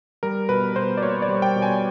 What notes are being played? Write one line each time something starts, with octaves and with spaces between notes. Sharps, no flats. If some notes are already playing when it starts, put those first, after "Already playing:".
G3 A#4
B2 B4
B2 C5
D5
A#3 C#5
D5
G3
G5
B2
G#5